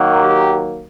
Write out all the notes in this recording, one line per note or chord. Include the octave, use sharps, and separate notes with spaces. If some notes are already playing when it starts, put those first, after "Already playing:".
Already playing: D#3 F#3 A#3
G4